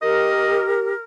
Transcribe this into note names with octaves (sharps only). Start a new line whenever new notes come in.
G4 A#4 D#5